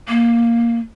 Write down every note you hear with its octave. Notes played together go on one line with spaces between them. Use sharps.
A#3